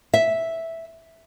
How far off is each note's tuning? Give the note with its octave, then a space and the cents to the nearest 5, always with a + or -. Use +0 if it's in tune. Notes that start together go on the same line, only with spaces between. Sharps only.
E5 -5